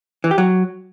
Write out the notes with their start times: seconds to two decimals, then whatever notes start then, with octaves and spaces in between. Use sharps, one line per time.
0.24 E3
0.31 G4
0.38 F#3